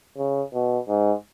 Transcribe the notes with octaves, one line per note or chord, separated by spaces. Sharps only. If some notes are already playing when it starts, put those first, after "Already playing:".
C#3
B2
G#2